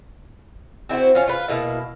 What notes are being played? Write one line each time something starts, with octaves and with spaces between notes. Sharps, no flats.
C4 E4 F#4 C5
C#4 F4
F4 B4
B2 A#3 E4